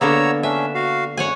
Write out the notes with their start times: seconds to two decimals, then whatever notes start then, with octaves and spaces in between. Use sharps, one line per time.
0.01 D3 A#3 B3 C#5 A#5 E6
0.43 C#4 D4 E5
0.75 F#4 F5
1.17 F#2 C#5 F#5 G#5